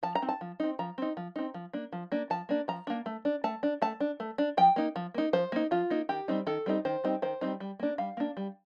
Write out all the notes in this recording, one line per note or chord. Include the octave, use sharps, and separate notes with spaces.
F3 A5
A#5
C4 D#4
A5
F3
C4 D#4
F3 A#5
C4 D#4
F3
C4 D#4
F3
A#3 D4
F3
A#3 D4
F3 A5
A#3 D4
F3 A#5
A#3 D4
A3
D4
A3 A5
D4
A3 A5
D4
A3
D4
F3 G5
A#3 D#4
F3
A#3 D#4
F3 C5
A#3 D#4
F3 F4
A#3 D#4
D#3 G4
G3 C4 D#4
D#3 A4
G3 C4 D#4
D#3 C5
G3 C4 D#4
D#3 C5
G3 C4 D#4
G3
A#3 D4
G3 F5
A#3 D4
G3